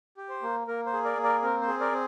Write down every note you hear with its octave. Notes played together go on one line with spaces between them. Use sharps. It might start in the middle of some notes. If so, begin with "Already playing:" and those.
G4
C5
A#3
A#3 A#4
C5
G#4
A#4 D5
A#3
A#4 D5
C4 A#4
C5
G#4
A#4 D5
C4